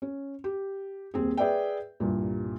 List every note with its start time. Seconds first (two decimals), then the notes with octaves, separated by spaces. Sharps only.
0.02 C#4
0.44 G4
1.14 D#1 C4 G#4
1.37 G#4 B4 D5 E5 G5
2.00 C2 G2 A#2